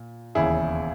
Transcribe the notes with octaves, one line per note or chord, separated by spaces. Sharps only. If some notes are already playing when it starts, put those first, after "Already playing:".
Already playing: A#2
E1 D#2 C#3 E4 G#4